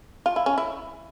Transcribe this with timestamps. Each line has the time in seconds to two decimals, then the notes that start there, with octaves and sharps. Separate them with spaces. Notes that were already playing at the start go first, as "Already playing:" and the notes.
0.26 F4
0.36 E4
0.46 C#4
0.58 E4